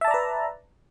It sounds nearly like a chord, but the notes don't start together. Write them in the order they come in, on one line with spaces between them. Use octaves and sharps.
E5 A5 D5 A#5 B4